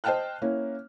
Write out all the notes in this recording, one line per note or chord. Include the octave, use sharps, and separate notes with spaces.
C5 D#5 G5 A5 F6 F#6
A#3 C#4 E4